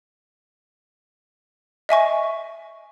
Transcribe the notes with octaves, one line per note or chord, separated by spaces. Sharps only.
D#5 E5 G#5 C#6